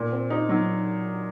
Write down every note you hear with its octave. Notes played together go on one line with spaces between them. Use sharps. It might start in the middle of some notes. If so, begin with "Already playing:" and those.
Already playing: A#2
C4
D#4
F#3